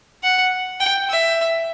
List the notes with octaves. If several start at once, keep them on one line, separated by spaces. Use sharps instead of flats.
F#5
G5
E5